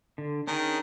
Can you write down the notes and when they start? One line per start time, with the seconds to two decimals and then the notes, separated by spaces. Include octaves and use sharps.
0.18 D3
0.47 D#3 C#4 D4 G#4